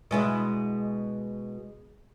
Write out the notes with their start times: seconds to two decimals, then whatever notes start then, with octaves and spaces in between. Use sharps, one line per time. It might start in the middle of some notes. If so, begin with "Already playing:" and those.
0.11 B2 G#3 E4